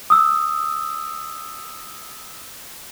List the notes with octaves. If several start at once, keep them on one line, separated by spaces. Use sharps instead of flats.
D#6 E6